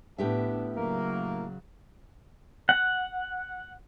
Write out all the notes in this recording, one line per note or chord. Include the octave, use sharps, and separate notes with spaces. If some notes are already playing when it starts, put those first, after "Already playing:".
A2 B3 D4 G4 E5
C#3 F#3 A#3
F#5